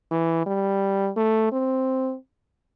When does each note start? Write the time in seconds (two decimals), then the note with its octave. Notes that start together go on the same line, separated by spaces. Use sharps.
0.11 E3
0.46 G3
1.17 A3
1.52 C4